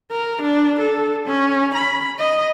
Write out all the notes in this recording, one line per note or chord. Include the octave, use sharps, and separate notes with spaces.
A#4
D4
A4
C#4
B5
D#5